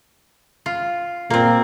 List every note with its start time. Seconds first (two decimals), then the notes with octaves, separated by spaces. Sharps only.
0.66 F4
1.30 A#2 A#3 C4